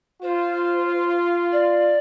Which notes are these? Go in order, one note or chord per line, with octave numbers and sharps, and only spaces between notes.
F4 C5
D5